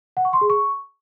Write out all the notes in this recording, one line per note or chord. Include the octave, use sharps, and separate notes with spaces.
F#5
C#6
C6
G#4
C#6